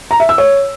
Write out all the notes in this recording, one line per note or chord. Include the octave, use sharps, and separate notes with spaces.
A#5
E5
E6
C#5